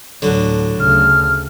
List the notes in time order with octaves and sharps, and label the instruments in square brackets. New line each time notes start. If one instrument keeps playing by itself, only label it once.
[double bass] D2 A2 [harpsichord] D3 F#3
[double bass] D2 C#3 [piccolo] F6